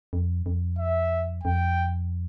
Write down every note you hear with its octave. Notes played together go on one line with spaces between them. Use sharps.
F2
F2
E5
F2 G5